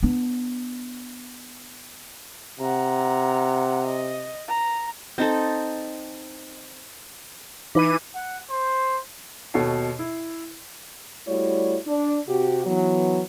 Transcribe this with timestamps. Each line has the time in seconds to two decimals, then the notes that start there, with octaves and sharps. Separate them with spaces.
0.03 B3 D4
2.60 C3 F#5 A#5
3.86 D#5
4.48 A#5
5.18 C4 D#4 A4
7.75 E3 D#4 B4 B5 D6 D#7
8.15 F#5
8.50 C5
9.54 D#2 B2 A4 C#5 C7
9.99 E4
11.28 G3 A3 E4 F#4 C#5 D5
11.87 D4
12.28 C3 F#4 G4
12.66 E3 F#3 B3